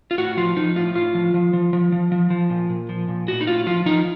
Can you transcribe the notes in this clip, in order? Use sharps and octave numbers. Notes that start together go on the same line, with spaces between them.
F4
A2 F#4
F3 F4
F3 D#4
A2 F4
A2 F4
F3
F3
F3
F3
F3
F3
F3
A#2
A#2
F3
A#2
A2 F#4
D#4
A2 F4
F3 F4
F3 D#4